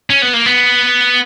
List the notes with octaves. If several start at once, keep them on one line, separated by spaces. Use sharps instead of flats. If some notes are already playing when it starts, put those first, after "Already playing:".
C#4
B3
A#3
B3